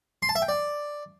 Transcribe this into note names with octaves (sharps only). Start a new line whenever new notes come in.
C6
A5
E5
G5
D5